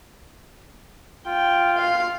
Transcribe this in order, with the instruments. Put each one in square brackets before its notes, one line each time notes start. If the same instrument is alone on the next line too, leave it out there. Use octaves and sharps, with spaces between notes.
[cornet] F4 [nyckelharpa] G5
[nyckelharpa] F5